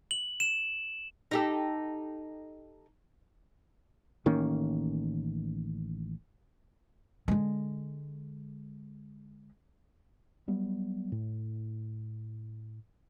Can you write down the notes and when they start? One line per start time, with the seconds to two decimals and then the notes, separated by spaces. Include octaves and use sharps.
0.11 F#7
0.40 E7
1.31 D#4 G4 A4
4.26 A1 D#3 A#3 C#4
7.28 D3 G#3
10.48 F#3 G3 B3
11.12 A2